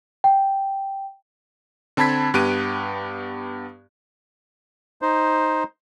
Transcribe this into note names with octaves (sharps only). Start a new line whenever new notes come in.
G5
D3 C4 A5 B5 G#6 B6
G2 B3 G4 F#6 D7 D#7
D#4 C5